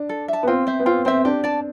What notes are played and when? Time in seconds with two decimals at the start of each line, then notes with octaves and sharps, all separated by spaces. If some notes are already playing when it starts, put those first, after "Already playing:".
Already playing: D4
0.09 A4
0.28 E5 A5
0.43 B3
0.47 C4 F4
0.67 C5 E5
0.80 B3
0.86 C4 F4
1.05 C4 C5 E5
1.25 D4 G4
1.44 D5 A5